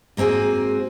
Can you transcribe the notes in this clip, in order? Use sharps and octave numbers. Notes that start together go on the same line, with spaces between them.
G#2 A#3 C4 F#4 G#4